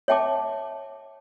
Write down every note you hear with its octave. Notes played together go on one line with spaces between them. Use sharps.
C#5 E5 G5 A5 D6